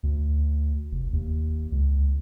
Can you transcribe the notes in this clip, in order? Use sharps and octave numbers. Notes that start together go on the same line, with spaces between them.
D2
F1
D#2
C#2